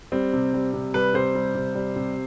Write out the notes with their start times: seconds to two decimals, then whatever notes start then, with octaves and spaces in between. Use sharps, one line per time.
0.12 G3 C4
0.33 C3
0.54 G3
0.74 C3
0.94 G3 B4
1.14 C3 C5
1.35 G3
1.55 C3
1.75 G3
1.96 C3